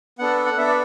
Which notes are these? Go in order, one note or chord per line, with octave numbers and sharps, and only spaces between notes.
B3 D4 A4 F#5
F#5
B3 D4 A4 E5
D5